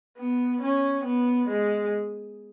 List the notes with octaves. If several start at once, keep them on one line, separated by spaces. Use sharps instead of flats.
B3
C#4
B3
G#3